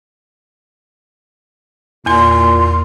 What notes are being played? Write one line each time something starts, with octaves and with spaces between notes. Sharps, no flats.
E2 A#2 G#5 C6